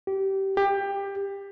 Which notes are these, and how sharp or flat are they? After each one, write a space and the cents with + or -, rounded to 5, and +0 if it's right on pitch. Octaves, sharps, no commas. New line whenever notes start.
G4 -20
G4 +20